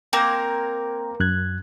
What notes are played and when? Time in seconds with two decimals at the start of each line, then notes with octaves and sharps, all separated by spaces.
0.13 A#3 C4 A#4 G5 A#5 G6
1.20 F#2 F#6 G#6